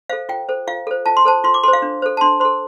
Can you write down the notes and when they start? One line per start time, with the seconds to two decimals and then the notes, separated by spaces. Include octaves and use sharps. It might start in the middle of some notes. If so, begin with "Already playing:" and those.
0.09 A4 C5 F5
0.29 F4 G5
0.49 A4 C5
0.67 F4 F5
0.87 A4 C5
1.06 F4 A5
1.17 C6
1.25 A4 C5 A5
1.44 F4 C6
1.54 D6
1.63 A4 C5 C6
1.73 F5
1.82 D4
2.02 A4 C5
2.17 A5
2.21 D4 C6
2.40 A4 C5 C6